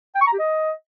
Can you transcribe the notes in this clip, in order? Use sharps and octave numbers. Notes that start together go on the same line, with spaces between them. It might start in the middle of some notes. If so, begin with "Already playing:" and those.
G5
C#6
A#5
G4
D#5